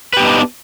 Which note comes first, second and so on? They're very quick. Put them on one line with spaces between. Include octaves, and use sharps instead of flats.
B4 G4 B3 D#4 D4